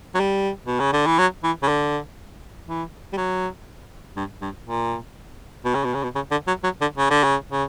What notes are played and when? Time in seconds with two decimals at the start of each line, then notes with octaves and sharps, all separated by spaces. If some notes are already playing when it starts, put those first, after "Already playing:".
0.14 F#3
0.20 G3
0.66 B2
0.79 C#3
0.93 D3
1.06 E3
1.18 F#3
1.43 E3
1.63 C#3
1.68 D3
2.68 E3
3.12 G3
3.17 F#3
4.16 G2
4.41 G2
4.66 A#2
5.65 B2
5.74 C#3
5.84 B2
5.94 C#3
6.03 B2
6.15 C#3
6.31 D3
6.47 F#3
6.63 F#3
6.81 D3
6.98 C#3
7.10 D3
7.23 C#3
7.52 C#3